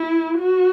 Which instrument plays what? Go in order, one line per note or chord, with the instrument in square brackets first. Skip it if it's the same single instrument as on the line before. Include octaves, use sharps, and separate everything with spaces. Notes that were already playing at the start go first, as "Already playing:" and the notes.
Already playing: [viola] E4
F#4